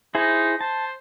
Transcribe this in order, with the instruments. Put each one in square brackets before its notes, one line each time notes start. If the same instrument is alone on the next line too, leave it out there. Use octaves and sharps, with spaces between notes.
[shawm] D#4 [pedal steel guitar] E4 G#4 C5
[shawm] C5 [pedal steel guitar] A5